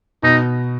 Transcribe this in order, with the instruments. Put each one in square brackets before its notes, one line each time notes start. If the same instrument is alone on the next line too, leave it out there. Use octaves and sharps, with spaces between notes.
[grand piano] B2 [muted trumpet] D#4